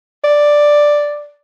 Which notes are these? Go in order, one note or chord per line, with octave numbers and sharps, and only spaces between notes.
D5